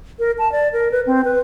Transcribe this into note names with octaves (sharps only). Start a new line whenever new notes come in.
A#4
A5
D5
A#4
B4
C4
B4